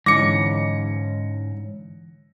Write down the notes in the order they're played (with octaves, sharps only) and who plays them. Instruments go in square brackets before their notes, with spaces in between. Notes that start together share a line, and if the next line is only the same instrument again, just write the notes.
[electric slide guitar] G#2 C#4 [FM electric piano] D3 E3 [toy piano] D6 [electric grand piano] A#6 C#7